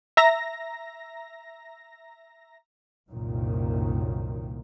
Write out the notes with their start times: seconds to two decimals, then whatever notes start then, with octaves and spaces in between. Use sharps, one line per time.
0.17 E5 A#5 A#6
3.10 C2 F#2 A#2 D#3